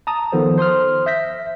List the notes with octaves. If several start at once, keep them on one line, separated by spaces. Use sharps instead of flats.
A5 A#5 D#6
D#3 F3 B3 A4 C5
C5 C6 D#6 F6
E5 G6 A#6 B6